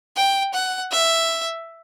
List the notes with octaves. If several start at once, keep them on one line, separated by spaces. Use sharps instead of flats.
G5
F#5
E5